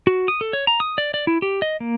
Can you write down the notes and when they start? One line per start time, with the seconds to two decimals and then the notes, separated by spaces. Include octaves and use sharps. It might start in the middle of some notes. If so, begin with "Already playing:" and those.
0.07 F#4
0.28 D#6
0.41 A4
0.53 C#5
0.67 A#5
0.80 D#6
0.98 D5
1.14 D5
1.27 E4
1.42 G4
1.62 D#5
1.80 A#3